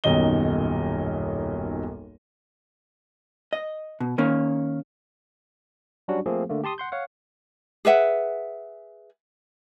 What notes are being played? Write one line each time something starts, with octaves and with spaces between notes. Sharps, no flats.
D#1 B1 F#2 D#3 D#5 G7
D#5
B2
D#3 A#3 C#4
F#3 G3 C#4 D4 F#4
F3 A3 A#3 C4 G#4
D3 A3 A#3
G4 A5 C6 D#6
F#5 C6 G6
C#5 F5 F#5
G#4 B4 E5 F#5